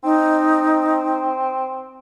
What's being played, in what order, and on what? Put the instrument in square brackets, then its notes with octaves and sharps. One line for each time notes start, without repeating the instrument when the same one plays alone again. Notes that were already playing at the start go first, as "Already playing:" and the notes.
[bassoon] C4 [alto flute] D#4